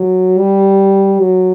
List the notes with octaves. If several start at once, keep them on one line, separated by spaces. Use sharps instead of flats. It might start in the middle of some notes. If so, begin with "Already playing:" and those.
Already playing: F#3
G3
F#3